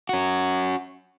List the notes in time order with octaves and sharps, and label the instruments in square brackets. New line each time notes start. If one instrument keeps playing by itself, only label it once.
[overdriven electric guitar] C#4 F#4